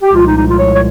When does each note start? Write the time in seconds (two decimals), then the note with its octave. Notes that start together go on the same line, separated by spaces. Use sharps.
0.03 G4
0.13 C2 A#2 F3 G#3 F4
0.24 D#4
0.35 D#4
0.47 F4
0.58 C#5
0.75 C#5